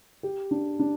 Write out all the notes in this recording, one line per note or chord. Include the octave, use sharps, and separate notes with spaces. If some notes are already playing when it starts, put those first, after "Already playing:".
G4
D4
D4